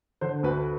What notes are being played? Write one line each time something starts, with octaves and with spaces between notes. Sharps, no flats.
D3 C5
D2 B4